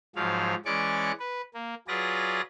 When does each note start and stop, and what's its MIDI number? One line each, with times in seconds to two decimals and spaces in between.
0.16 0.55 44
0.16 0.55 53
0.16 0.55 54
0.16 0.55 77
0.65 1.12 52
0.65 1.12 56
0.65 1.12 61
0.65 1.12 74
0.65 1.12 85
0.65 1.12 86
1.20 1.42 71
1.54 1.75 58
1.88 2.41 54
1.88 2.41 65
1.88 2.41 68
1.88 2.41 71
1.88 2.41 74
1.88 2.41 94